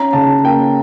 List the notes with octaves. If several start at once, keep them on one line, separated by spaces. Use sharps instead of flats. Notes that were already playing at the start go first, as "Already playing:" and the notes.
Already playing: C#4 A#5
C#3 A5
A#3 G5